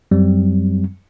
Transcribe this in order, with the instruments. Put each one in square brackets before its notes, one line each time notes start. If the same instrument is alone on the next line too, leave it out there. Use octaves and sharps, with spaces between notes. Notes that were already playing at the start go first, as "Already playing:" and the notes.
[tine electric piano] F#2 F#3 G3 C4